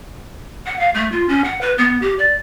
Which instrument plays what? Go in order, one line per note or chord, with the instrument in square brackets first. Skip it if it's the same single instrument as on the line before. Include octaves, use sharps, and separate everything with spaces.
[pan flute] F#5
F5
A3
F4
C#4
F#5
B4
B3
G4
D5